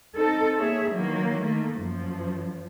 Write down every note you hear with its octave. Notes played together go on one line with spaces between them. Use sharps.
C4 D#4 A4
A#3 G#4 C#5 E5
D#3 E3 F#3 A#3
D#3 A3 A#3
F#2 F3